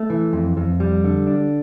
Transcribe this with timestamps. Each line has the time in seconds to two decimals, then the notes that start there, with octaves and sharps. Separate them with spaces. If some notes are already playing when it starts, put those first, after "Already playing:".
Already playing: A3
0.10 E3
0.33 F2
0.57 F2
0.80 G3
1.04 D3
1.27 D4